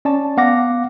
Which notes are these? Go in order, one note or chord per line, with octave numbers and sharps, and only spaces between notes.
C#4 D5 A5
B3 F5 F#5 D6 A#6